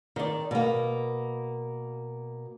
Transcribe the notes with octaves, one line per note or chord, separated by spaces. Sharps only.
D#3 D5
B2 A#3